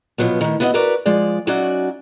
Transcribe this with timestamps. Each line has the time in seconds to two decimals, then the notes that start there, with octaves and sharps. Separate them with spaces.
0.18 B2 F3 F#3 B3
0.41 A2 D#3
0.60 B3 E4 F#4 C#5 D#5 F#5
0.74 E4 F#4 A#4 B4 D5
1.06 F3 G#3 D5
1.47 F#3 C#4 D#4 F#4 D5 E5